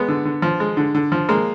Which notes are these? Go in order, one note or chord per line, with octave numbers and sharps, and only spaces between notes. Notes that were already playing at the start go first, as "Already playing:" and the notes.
Already playing: G#3 B3
D3
D3
F3
G#3
D3
D3
F3
G#3 A#3